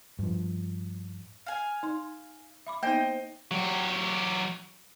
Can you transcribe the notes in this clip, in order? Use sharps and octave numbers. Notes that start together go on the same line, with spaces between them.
G2 F3
F5 G#5
D#4 C6
E5 B5 D6
A#3 B3 D#4 C5 D#5 G5
F#3 G4